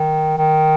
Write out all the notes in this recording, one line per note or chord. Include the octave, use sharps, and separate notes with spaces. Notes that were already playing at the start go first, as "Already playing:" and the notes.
Already playing: D#3
D#3